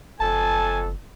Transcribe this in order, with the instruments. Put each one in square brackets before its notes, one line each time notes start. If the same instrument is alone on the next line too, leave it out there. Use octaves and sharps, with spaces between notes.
[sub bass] F#1 [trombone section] F2 A4 [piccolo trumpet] G#5 [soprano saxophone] A5